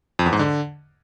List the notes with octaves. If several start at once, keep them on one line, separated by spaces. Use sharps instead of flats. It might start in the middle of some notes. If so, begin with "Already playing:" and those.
F2
E2
G#2
D3